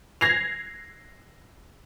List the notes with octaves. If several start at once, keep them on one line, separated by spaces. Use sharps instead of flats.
G#6 A#6 C7 F7